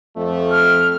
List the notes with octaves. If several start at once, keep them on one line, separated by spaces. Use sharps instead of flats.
F2 A3
F6